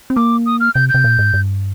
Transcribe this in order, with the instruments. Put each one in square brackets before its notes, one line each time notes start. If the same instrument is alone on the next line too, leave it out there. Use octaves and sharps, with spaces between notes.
[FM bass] C4
[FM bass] A#3 [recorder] D6
[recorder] D#6
F6
[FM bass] C3 [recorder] G6
[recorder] G6
[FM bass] C3
A#2
G#2
G2